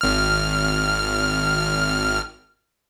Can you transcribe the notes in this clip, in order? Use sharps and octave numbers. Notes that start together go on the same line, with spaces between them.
G#1 F6